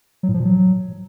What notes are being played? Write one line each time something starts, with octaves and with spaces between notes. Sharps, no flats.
F#3
A2
F3
A#2
F#3